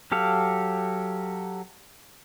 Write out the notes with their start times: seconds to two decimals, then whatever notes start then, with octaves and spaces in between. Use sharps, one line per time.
0.12 F#3 G4 A4 F5